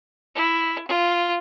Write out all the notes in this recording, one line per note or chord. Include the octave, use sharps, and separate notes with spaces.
E4
F4